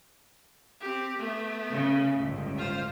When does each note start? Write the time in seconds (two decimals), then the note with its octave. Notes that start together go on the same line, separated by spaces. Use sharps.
0.80 C4 G4
1.19 A3 B3
1.69 C#3
2.15 G1 C#2 A2
2.58 F4 C5